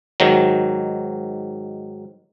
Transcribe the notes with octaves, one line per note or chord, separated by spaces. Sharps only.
G#2 D#3 F#3